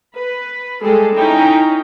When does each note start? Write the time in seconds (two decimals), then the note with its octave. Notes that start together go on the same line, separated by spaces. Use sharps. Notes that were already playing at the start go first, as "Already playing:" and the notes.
0.15 B4
0.82 G3 G#3 G#4 A4
1.15 C#4 D#4 E4 G5 A#5